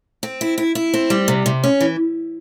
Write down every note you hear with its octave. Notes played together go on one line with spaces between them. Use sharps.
C4
E4
E4
E4
C4
G3
C3
C3
C#4
E3